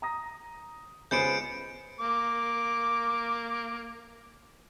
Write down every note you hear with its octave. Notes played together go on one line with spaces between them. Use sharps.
A#5 D#6 A#6
C#2 C#3 G#3 B3 C5 G6 C#7 D7
A#3 D6